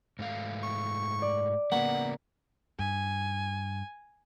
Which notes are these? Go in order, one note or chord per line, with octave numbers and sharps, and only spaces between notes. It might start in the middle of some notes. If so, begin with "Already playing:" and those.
G#2 A3 F5
C#6
D5
C#3 A#3 B3 F#5 B6
G2 G#5